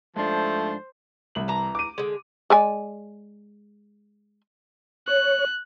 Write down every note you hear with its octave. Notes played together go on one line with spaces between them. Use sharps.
G#2 F3 A3 D4 C5
C2 F#7
E3 A#5
D6 D#7
D3 G#3
G#3 D5 G#5
C#5 F#6